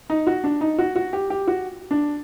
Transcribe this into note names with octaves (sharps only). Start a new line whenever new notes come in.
D#4
F#4
D4
D#4
F#4
F#4
G4
G4
F#4
D4